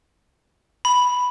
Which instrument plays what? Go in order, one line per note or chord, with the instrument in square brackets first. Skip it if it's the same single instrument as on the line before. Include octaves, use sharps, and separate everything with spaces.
[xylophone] B5